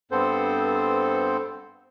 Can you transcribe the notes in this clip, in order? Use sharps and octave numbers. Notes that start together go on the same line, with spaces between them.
G2 B3 C4 A4 C5